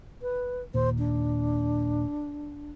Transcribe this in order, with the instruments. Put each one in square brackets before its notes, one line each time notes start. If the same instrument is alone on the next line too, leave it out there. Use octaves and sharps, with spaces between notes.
[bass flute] B4
[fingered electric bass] D#2 A#2 [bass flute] C5
[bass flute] D4